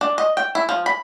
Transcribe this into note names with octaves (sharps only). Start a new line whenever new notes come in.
D4
D#5
G5
E4
F3
B5